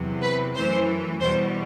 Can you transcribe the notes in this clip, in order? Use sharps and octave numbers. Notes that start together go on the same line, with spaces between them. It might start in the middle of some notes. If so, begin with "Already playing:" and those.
Already playing: E2 C3 F#3
B4
F#2 E3 A3 C5
E2 B2 G3 C5